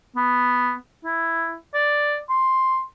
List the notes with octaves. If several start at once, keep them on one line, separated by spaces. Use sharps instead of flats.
B3
E4
D5
C6